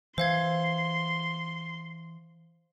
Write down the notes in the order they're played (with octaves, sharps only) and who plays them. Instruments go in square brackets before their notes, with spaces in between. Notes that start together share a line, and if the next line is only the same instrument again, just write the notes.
[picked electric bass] E3 [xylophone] C5 F5 G#6 [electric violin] C6